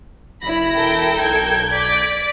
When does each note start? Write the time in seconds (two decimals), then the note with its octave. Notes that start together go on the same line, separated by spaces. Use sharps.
0.43 F#1 E4 B5 A#6
0.75 E1 A4 A#4 G5
1.21 B1 G6 G#6
1.70 D5 D6 B6